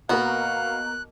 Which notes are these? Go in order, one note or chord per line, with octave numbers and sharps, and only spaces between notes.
B2 A#3 B3 F#4 A#4 F5 F#6